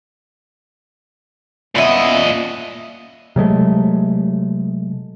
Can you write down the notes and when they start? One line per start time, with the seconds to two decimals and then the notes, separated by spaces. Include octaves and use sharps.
1.75 A#2 B3 C#4 E4 D#5
3.36 C3 F#3 G#3 A3